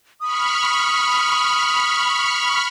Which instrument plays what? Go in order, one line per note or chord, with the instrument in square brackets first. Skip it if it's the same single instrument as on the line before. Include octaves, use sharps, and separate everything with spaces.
[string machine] B5 C#6 F6 [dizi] D#6